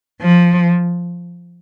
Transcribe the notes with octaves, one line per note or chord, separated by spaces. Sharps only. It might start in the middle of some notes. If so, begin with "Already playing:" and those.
F3